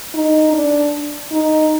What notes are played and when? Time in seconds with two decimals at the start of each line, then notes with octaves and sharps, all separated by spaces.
0.14 D#4
0.53 D4
1.32 D#4